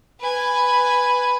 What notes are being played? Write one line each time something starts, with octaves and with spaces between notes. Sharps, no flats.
B4 G#5